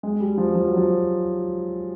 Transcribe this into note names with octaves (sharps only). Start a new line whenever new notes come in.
G#3
G3
F3
F3
F#3
F3